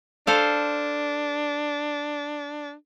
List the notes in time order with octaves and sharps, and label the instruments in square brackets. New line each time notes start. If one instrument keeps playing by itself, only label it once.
[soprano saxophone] D4 [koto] A4 C5 F5